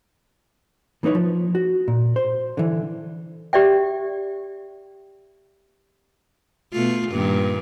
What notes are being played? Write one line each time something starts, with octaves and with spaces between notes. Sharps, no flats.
E3 A#3 D#4 B4 C#5
F3
F#4
A#2
C5
D3 E3
G4 D5 E5 G5
B2 A3 F4
G2 A#2 D#3